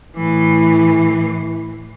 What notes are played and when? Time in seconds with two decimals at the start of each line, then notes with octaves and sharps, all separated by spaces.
0.16 A2 E3